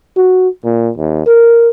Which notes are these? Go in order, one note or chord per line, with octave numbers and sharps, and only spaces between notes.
F#4
A#2
D#2
A#4